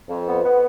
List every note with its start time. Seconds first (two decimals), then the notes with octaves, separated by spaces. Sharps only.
0.09 F2
0.27 B3
0.44 B3